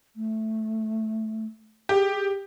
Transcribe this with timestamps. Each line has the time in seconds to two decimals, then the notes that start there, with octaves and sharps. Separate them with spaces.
0.15 A3
1.89 G4 G#4